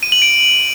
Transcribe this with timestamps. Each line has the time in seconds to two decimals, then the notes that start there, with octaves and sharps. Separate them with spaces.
0.03 D#7
0.12 F#7
0.22 D7